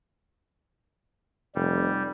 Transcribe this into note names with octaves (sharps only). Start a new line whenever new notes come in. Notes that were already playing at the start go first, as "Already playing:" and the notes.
F1 G3